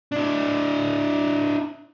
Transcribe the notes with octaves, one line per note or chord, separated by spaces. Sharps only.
D4 E4